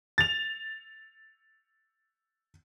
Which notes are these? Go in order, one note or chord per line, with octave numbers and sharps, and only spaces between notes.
A6 F7